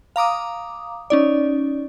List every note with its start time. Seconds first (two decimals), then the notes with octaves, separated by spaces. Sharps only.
0.16 F5 A#5 D6 D#6
1.10 C#4 D#4 D5